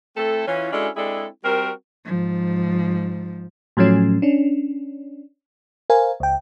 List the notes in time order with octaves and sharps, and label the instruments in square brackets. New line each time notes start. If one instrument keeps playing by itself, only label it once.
[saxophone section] A3 C4 E4 A4
E3 C#4 F4
G#3 C#4 D4 E4 F#4 A4
G#3 C4 D4 E4 G#4 A4
G3 C4 F#4 A#4
[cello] G#2 F3
[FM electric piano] A2 F3 F#3 A3 C#4
C#4 D4
A#4 C5 F5 G#5
C#2 G5